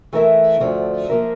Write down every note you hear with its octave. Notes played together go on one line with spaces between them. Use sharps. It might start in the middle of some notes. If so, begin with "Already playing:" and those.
E3 A3 E4 A#4 E5
D2 D3 F3 A3
F3 A#3 F4 A#4 E5